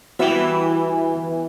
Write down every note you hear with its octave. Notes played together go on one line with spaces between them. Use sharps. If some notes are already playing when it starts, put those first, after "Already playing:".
E3 G3 B3 F#4 E5